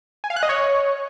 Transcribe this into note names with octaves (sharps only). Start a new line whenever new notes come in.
G#5
F5
F#6
D#5
C#5